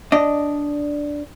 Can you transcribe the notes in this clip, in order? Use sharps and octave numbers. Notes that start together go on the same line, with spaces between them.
D4 D#5